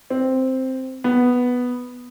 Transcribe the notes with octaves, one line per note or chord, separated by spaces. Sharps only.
C4
B3